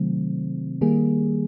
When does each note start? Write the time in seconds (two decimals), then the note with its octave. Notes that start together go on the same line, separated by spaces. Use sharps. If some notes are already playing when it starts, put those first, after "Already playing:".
Already playing: C3 D#3 F#3 A3 C4
0.81 D#3 G3 A#3 G#4